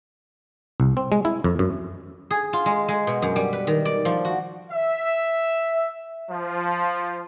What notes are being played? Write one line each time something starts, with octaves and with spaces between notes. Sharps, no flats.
C2
C4
G#3
E4
F2
F#2
G#4
F4
G#3
G#3
B2
F#2
G3
B4
D#3
D5
F3
F#4
E5
F3